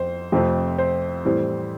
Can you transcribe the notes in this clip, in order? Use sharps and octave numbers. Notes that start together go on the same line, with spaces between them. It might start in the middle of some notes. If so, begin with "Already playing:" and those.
Already playing: F2 C5
F2 C3 F3 A3 C4
C5
A2 E3 G3 C4